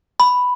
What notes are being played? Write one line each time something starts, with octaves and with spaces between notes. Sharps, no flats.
B5